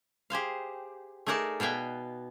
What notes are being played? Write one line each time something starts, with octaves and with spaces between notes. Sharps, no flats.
G4 G#4 C5 F5
A3 D#4 G#4 A#4 D5 A5
B2 B3 F5 G5 G#5